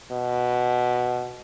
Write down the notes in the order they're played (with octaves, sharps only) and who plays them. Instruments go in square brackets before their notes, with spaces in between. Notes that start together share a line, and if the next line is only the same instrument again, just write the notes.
[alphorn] B2